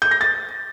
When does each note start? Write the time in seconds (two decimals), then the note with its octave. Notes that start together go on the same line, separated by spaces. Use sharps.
0.02 G6
0.11 A#6
0.21 A6